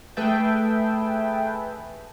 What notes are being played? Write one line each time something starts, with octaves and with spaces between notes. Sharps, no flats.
A3 G#4 B4 E5 G5 A5